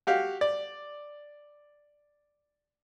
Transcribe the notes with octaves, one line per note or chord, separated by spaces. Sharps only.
F#4 G4 F5
D5